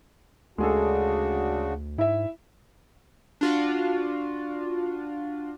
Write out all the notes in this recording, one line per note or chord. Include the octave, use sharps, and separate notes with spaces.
D2 C#3 G#3 D4 F#4 G#4 A4
G#2 E4 E5
D4 F4 F#4